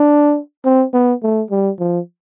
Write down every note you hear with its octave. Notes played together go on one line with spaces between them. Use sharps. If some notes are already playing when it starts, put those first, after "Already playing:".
Already playing: D4
C4
B3
A3
G3
F3